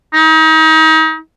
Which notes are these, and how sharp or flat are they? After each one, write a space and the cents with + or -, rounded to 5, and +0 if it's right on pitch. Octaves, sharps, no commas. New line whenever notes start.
D#4 +35